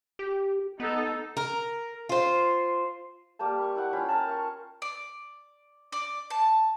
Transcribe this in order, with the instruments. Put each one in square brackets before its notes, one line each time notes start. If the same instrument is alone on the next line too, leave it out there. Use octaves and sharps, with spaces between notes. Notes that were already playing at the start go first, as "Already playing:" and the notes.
[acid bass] G4
[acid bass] B3 [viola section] D#4 A4
[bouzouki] A#4
F4 C5
[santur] G3 A#3 G5 A5
B5 C#6
E4 D5 F#5 C#6
C#4 F4 G5 B5
A#4 A5
C#6
[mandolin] D5
D5
A5